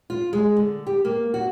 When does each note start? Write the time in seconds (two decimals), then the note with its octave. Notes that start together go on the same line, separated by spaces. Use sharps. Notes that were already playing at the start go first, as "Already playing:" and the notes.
0.10 F4
0.33 G#3
0.57 D3
0.87 G4
1.05 A#3
1.34 F#4